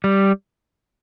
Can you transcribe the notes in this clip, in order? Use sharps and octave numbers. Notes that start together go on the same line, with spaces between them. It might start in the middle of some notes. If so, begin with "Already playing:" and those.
G3